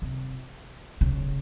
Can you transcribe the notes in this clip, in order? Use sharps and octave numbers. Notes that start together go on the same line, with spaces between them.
C3
C#3